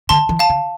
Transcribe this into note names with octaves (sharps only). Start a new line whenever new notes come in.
D3 A5 C6
E3
F5 A5
D3